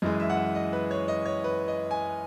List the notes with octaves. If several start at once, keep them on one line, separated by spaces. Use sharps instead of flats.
F#2 E3 G#3 D#5
E5
F#5
E5
D#5
B4
C#5
D#5
C#5
B4
D#5
G#5